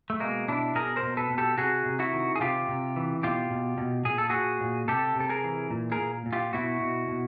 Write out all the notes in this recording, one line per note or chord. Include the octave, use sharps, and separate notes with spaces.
A3
B2 G#3 A#3
B2 D4 E4
B2 G#4 A#4
A#4 C5
B2
A4 B4
B2
G4 A4
C3 F#4 G#4
C3
E4 F#4
D#3
G#4
C3 F4 G4
C3
E3
B2 F4 G4
B2
B2
A#2 G#4
A4
A#2 F#4 G#4
A#2
C3 G4 A4
C3 A4
G#4 A#4
E3
A#2
G#4 A#4
A#2
A#2
F4 G4
B2 E4 F#4
B2
B2